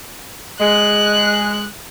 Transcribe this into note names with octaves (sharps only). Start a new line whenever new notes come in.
G#3 F#6